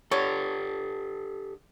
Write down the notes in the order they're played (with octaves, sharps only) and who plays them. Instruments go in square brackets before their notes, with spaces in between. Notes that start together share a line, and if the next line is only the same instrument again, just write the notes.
[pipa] D3 C#5 [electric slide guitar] G4 A4